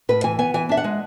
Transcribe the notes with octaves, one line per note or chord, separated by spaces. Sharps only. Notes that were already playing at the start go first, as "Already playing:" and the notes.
A2 B4
E3 G#5
B3 G#5
E3 G#5
D4 E5
F#5
G#3